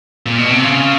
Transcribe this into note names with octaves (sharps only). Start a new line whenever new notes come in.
A#2
B2
C3
C#3